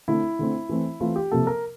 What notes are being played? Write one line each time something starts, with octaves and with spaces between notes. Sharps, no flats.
D3 A3 C4 E4
D3 A3 C4
E3 A3 C4
E3 A3 C4 F4
G4
C3 F3 A#3 A4
A#4